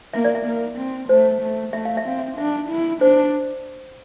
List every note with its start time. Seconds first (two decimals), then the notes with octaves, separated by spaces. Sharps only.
0.14 A#3 E5
0.24 D5
0.35 E5
0.46 A#3
0.77 C4
1.09 A3 C5
1.41 A3
1.73 A3 E5
1.85 F5
1.97 E5
2.06 C4 F5
2.19 E5
2.37 D4 E5
2.70 E4
3.01 D4 C5